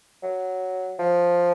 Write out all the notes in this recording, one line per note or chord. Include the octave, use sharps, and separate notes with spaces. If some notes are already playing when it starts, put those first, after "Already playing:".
F#3
F3